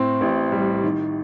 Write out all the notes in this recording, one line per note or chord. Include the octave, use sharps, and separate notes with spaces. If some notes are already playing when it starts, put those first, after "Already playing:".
Already playing: A2 C4
A1
G3
D#3